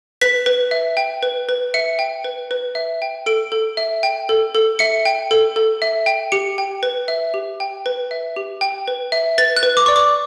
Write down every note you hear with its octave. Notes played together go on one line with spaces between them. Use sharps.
B4 B6
B4
E5
G5
B4
B4
E5 C#7
G5
B4
B4
E5
G5
A4 D7
A4
E5
G5
A4
A4
E5 C#7
G5
A4
A4
E5
G5
G4 C#7
G5
B4
E5
G4
G5
B4
E5
G4
G5
B4
E5
B4 A6
F#6
B4
D6
D5 C#6
D6